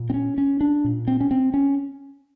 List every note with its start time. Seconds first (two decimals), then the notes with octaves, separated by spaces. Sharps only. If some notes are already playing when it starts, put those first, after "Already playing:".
Already playing: A#2
0.10 C4
0.14 C#4
0.38 C#4
0.61 D4
0.84 A#2
1.08 C4
1.21 C#4
1.31 C4
1.54 C#4